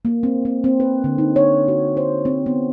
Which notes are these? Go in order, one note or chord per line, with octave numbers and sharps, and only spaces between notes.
A#3
C4
C4
C4
B4
D3
D#4
C#5
F#4
C5
C4
B3